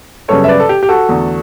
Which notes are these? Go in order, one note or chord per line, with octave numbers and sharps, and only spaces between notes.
F#2 C#3 G3 B3 A4 C#5
E5
B4 D5
A4
G4
G4
F#4 A4
E2 D3 A3